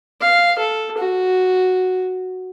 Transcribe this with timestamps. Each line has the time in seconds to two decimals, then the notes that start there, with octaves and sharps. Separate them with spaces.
0.21 F5
0.59 A4
0.98 F#4